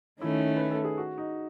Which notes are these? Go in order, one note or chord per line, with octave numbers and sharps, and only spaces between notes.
D#3 A3 C#4 E4
B4
A4
G#4
F#4
D#4